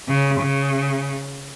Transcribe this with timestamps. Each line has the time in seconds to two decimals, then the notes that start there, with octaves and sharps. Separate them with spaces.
0.08 C#3
0.41 C#3